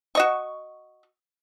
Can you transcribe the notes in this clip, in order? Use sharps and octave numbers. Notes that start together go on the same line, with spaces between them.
F#4 D#5 C#6